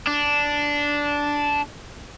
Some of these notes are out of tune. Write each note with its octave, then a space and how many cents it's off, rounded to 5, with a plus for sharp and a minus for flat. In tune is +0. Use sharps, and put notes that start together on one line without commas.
D4 -10